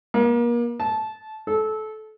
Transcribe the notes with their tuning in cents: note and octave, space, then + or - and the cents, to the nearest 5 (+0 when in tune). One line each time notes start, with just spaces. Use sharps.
A#3 +35
A5 -20
A4 -25